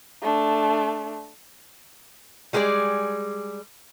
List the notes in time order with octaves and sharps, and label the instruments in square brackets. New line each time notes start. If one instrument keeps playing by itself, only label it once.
[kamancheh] A3 D4
[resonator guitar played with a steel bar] G3 G#3 G#4 A#4 D5